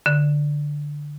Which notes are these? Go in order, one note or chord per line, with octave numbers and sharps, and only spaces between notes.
D3